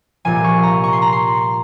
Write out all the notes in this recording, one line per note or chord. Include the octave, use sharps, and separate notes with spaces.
C2 A#2 F3 G#5
C#6
A#5
C#6
C6
A#5
C6